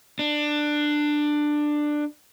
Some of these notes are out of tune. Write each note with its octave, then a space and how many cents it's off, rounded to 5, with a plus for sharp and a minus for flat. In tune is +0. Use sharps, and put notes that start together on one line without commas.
D4 +15